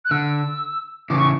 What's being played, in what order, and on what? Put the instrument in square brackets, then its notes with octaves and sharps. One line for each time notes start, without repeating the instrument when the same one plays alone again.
[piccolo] F#6
[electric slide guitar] D3 [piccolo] E6
[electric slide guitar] C#3 E3 [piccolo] D6
[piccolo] C#6